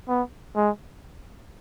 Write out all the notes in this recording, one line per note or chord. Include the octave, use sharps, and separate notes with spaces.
B3
G#3